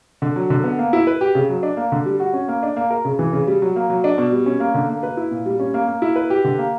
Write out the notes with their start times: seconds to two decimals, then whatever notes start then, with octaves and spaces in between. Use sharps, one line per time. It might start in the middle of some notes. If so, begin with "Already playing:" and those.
0.22 D3
0.36 F#3
0.50 D3
0.64 B3
0.79 A#3
0.93 E4
1.07 B4
1.21 G4
1.35 C#3
1.50 F#3
1.63 D4
1.77 A#3
1.92 D3
2.06 G3
2.20 F#4
2.34 C#4
2.48 A#3
2.63 D4
2.76 A#3
2.90 A#4
3.05 C#3
3.19 E3
3.33 C#3
3.47 G3
3.62 F#3
3.76 A#3
3.90 F#3
4.04 D4
4.18 B2
4.32 G3
4.46 C#4
4.60 A#3
4.74 D3
4.89 A#3
5.03 B4
5.17 E4
5.31 A#2
5.46 G3
5.60 C#4
5.74 A#3
5.87 A#3
6.02 E4
6.16 B4
6.30 G4
6.44 D3
6.59 A#3